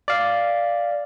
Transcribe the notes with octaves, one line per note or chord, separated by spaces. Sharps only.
D5 F5